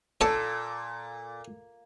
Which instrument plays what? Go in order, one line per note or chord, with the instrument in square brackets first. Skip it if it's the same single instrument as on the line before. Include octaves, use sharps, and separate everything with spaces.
[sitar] A#2 [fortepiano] A4 [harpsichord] C#5 D5 A5